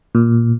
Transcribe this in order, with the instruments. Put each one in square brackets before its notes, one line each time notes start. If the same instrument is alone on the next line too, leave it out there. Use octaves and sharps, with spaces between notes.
[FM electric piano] A#2